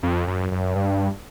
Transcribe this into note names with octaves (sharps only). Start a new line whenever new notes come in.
F2
F#2
F#2
G2